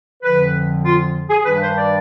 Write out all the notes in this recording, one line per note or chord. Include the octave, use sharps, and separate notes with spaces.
F2 D3 F3 B4
F4
G#4
G2 D#3 G3 D4 B4
C5
D5